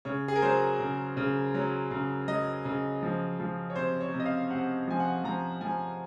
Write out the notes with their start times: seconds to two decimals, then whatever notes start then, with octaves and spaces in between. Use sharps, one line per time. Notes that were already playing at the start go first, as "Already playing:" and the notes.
0.05 C#3 C#5
0.28 G#4
0.36 A#4
0.42 F#3 C5
0.79 C#3
1.17 C#3
1.54 F#3
1.91 C#3
2.28 F#3 D#5
2.65 C#3
3.03 F3
3.40 F3
3.70 C#5
3.76 C3 C5
4.01 C#5
4.13 C3
4.20 D#5
4.26 F5
4.50 C3 F#5
4.88 F3 G#5
5.00 F#5
5.24 F3 A#5
5.61 F3 G#5